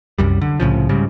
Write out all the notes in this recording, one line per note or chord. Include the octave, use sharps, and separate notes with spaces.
C2 F#2 G3
D3
C2 A2 C#3 F3
G#2 C#3 G3